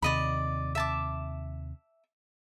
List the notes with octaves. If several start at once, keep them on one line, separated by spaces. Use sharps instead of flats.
D#2 C3 D5 D#5 B5
E5 A5 D6